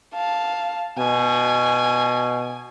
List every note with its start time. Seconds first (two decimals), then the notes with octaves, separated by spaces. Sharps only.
0.15 F5 A5
0.99 B2 G#5